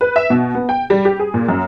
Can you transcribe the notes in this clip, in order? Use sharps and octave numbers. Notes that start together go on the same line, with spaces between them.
B4
E5
B2
B3
G5
G3
G4
G#4
A#2
F#2